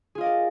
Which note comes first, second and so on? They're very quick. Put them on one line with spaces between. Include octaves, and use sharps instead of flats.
G#4 F4 D#5 D5 A#4